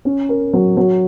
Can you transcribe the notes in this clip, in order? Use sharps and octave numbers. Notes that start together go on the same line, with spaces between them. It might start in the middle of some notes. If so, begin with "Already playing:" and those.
C#4
A#4
F#3
F#3